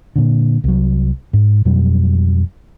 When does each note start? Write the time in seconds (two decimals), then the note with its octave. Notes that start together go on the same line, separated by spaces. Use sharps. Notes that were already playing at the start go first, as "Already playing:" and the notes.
0.16 A#2 D3
0.64 C2 F#3
1.33 G#2
1.65 F2 B2 F#3 G3